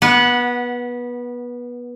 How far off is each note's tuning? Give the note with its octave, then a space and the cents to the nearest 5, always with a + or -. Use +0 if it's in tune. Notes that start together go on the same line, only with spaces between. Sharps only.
B3 -20 F#5 +0